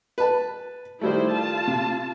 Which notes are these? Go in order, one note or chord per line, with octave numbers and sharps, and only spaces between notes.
B4 A5
D#3 G3 A3 E4 C5
F4 A5
C3